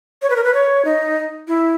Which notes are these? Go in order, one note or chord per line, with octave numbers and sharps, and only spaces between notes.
C#5
B4
A#4
B4
C#5
D#4
E4